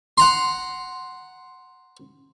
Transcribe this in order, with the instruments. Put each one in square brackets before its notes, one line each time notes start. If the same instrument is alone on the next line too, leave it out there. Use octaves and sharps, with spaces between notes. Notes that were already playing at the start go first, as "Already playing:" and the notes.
[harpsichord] F#5 A#5 C6